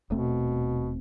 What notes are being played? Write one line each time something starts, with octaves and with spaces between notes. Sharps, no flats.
D#1 B2 A3 C4